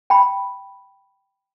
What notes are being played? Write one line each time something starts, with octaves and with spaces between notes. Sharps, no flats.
G5 B5